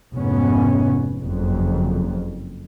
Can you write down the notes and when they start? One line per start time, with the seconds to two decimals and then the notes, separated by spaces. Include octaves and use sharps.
0.13 F1 G#2 B3 C#4
1.23 F#1 F2